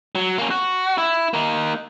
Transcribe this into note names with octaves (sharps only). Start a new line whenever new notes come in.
F#3
A#3 C#4
F#4
E4
A#3 D#4